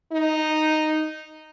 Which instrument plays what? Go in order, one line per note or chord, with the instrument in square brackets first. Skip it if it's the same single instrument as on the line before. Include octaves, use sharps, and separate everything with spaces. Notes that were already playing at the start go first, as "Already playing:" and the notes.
[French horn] D#4